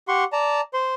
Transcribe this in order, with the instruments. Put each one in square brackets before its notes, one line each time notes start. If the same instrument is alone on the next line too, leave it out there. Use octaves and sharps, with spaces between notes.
[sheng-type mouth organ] G4 F#5 C6 C#6
D5 A5 A#5
C5 C6